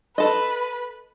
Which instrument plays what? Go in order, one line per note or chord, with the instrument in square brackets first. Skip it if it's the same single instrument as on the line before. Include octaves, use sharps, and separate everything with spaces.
[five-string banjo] A4 D#5 [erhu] B4